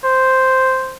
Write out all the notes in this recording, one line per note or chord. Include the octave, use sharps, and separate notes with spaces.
C5